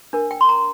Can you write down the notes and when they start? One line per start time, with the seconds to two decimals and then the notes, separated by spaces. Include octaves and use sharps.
0.13 D4 A#4
0.31 G5
0.41 C6
0.49 A#5